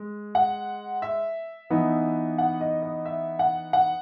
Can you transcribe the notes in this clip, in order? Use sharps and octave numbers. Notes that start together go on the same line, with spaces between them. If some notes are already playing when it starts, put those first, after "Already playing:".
Already playing: G#3
F#5
E5
E3 B3 D#4
F#5
D#5
D#5
E5
F#5
F#5